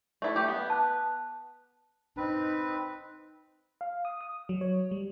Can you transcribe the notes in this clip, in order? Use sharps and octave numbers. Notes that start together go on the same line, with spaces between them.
A3 E4
A3 G4
B3
A5 F#6
C4 D#4 B4
F5
D#6
D#6
F#3
C#5
G3